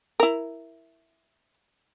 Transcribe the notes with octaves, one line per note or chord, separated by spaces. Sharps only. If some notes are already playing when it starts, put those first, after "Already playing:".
E4 A#4